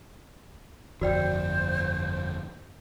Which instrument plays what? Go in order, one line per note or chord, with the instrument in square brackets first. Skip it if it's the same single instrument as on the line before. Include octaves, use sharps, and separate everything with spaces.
[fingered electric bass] G1 F2 [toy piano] F#4 D5 G5 [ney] C5